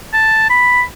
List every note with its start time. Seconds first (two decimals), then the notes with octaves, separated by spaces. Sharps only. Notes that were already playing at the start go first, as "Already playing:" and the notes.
0.14 A5
0.50 B5